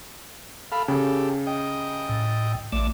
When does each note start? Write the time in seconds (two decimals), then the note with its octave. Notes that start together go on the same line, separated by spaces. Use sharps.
0.72 A4 F5 B5
0.88 C#3 G4 A4
1.47 D#5 G5
2.09 A2
2.72 A1 A3 D5